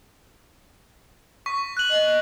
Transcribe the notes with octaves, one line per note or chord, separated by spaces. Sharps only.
C#6 B6
F#6 F#7
D#5